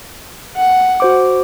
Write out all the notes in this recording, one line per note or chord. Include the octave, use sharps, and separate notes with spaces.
F#5
F#4 C5 D6